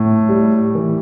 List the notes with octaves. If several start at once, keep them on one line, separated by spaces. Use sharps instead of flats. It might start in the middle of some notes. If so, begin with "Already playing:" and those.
Already playing: A2
G3
E3